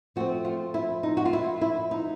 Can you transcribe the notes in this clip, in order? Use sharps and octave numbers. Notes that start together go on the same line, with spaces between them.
F3 A3 C4 F#4
F4
E4
D#4
F#4
F4
E4
E4
D#4